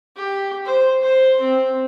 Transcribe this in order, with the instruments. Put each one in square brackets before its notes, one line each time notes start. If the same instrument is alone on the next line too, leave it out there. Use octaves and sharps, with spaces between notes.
[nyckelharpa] G4
C5
C5
C4